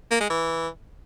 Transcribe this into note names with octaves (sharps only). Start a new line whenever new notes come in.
A#3
G#3
E3